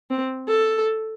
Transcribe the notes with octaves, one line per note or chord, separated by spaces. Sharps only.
C4
A4